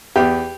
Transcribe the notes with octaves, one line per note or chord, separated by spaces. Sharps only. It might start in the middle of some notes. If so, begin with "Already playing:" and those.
E2 G4